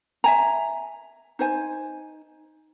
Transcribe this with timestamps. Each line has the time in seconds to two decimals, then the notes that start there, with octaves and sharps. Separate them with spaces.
0.24 E5 G#5 A#5
1.39 D#4 C5 G#5